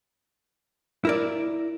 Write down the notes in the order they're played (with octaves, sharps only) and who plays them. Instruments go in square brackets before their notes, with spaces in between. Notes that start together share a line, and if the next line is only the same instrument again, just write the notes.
[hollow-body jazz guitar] E4 A#4 D5